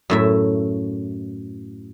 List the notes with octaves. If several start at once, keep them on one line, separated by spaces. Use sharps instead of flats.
F#2 A2 E5